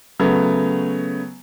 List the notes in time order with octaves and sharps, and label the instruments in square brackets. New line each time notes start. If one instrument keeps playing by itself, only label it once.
[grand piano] C#3 F#3 A3 B3